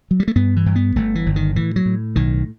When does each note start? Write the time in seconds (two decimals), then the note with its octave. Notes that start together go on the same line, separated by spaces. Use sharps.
0.11 F#3
0.20 G3
0.28 A3
0.36 G2 B3
0.56 E3
0.66 G2
0.76 B3
0.96 G1 A3
1.15 E3
1.26 G1
1.36 D#3
1.56 A2 E3
1.76 F#3
1.86 A2
2.16 B1 D#3